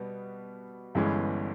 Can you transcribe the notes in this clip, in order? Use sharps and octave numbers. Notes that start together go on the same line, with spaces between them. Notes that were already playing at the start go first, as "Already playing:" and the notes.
Already playing: B2 G3 B3
G1 G2 E3 G#3 C#4